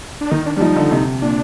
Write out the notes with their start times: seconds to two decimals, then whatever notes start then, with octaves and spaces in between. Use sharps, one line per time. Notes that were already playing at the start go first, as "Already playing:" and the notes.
0.21 D4
0.31 D#3 D#4
0.46 D4
0.56 G3 D4
0.61 F3 D#4
0.76 D3
0.92 C3
1.22 A#2 D4